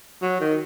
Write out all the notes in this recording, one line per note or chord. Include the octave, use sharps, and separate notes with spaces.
F#3
D#3